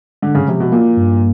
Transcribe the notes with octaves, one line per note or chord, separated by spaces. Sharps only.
D3 G#3
C#3
C3 F3
B2
A#2 A#3
G2